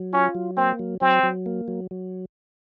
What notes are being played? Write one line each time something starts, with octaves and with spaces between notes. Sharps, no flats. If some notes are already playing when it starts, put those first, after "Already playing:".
Already playing: F#3
C#4 F4
F#3
A#3 C4
F#3
F#3 C4
F#3
A#3
F#3
F#3